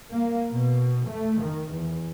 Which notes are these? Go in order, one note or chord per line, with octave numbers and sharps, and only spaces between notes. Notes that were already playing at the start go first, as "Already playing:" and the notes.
A#3
B2
A3
D#3
E2